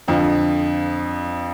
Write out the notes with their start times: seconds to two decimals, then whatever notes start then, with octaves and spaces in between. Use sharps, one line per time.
0.08 F2 D3 F3